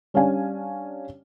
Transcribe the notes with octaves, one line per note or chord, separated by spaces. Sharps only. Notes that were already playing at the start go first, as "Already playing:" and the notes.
G3 C#4 D4 F5 G#5